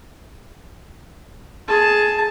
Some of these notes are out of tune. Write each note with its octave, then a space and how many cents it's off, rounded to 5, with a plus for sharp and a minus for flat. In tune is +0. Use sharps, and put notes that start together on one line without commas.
G#4 +15 A5 +0